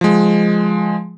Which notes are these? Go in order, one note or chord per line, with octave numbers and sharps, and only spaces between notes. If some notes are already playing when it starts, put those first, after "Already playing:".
F3 G#3